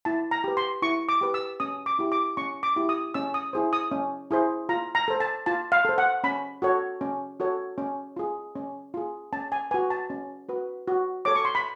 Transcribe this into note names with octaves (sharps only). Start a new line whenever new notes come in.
E4 A5
A#5
G4 B4
C6
E4 C#6
D6
G4 B4
E6
C#4 D#6
D6
E4 G4
D6
C#4 C#6
D6
E4 G4
D#6
C#4 E6
D#6
E4 G#4 C5
D#6
C#4
E4 G#4 C5
F4 A#5
A#5
A4 C5
A5
F4 A5
F5
A4 C5
F#5
C#4 B5
F#4 A4 C#5
C#4
F#4 A4 C#5
C#4
F4 G#4
C#4
F4 G#4
C#4 A5
G#5
F#4 B4 G#5
A5
C#4
F#4 B4
F#4
A4 C#5 D6
C#6
C6
B5